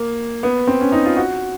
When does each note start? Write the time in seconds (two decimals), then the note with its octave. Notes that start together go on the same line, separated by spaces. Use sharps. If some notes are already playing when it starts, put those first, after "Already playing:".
Already playing: A#3
0.43 B3
0.67 C4
0.81 C#4
0.92 D#4
1.05 F4
1.17 F#4